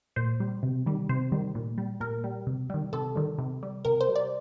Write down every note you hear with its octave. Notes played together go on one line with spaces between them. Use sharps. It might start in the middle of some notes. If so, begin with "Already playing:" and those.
A#2 C5
G3
C3
D#3 G3
C3 C5
D#3 G3
A#2
G3
A#2 A#4
G3
C3
D#3 G3
C3 A4
D#3 G3
C3
G3
C3 A#4
C5
G3
D5